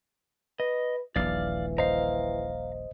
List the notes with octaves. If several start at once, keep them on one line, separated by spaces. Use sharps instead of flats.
B4 D#5
D#1 A#1 E3 D5 F5 F6
C5 D#5 F5 A#5